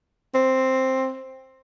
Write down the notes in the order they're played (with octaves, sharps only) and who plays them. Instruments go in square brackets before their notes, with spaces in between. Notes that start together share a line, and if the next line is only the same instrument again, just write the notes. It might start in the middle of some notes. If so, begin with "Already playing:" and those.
[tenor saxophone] C4